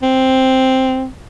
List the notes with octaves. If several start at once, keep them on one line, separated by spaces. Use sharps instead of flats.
C4